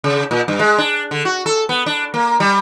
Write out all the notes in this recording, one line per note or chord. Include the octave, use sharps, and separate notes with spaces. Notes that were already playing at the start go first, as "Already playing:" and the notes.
C#3
A#2
G2
G#3
D4
D3
F#4
A4
B3
D4
A#3
G3